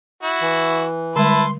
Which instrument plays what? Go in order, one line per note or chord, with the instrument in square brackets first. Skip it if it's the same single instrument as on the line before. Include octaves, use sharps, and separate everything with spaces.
[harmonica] E4 F#4
[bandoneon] E3
[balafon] D3 G3 G#3 [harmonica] E4 B4 A5 [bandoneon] C6